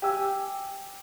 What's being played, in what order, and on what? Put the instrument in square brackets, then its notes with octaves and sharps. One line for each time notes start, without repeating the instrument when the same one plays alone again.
[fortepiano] G4 G#5 E6